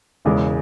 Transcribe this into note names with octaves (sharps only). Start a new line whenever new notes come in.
E1 E2 C#3 G#3